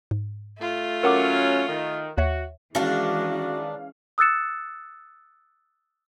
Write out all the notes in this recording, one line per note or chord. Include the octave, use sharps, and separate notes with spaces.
G#2
A3 F4
F#3 C#4 A#4 F#5 D6
D#3
D#2 F#4 C#5 E5
D#3 E3 G#3 C#4 D4 F#4 F5
D#6 E6 F#6 A6 C#7 E7